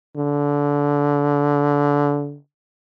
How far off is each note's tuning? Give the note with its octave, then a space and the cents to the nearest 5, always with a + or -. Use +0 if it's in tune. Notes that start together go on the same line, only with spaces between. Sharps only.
D3 -20